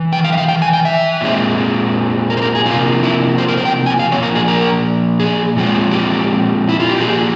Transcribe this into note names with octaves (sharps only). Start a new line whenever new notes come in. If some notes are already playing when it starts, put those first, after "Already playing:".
Already playing: E3
G5
F5
E5
F5
G5
G#5
G5
E5
A#2 G#3 C4
A#4
C5
A#4
G#4
C3 F3 A#3 F4
E4
C5
A#4
C5
G5
G#5
F5
A#2 F3 A#3 C#5
A#4
G#4
A#4
G#4
A#2 F3 G#3 C4
G4
E4
F4
G4
A#2 F3 A#3 G#4